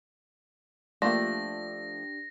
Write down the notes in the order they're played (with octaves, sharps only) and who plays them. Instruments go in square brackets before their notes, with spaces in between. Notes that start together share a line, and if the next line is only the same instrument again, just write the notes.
[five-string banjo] F3 A3 [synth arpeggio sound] A#3 F4 [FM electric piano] D4 G4 [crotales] A#6